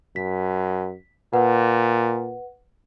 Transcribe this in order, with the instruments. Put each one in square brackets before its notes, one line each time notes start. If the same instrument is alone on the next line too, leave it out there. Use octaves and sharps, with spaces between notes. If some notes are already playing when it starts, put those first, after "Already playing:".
[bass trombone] F#2 [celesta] B6
[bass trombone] A#2 [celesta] B4 F#5